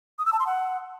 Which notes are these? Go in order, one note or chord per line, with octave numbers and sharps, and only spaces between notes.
D#6
E6
A5
C6
F#5